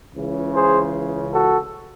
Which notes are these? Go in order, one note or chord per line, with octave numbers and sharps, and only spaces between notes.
C#2 C#3 E3
G#4 C5
F#4 A4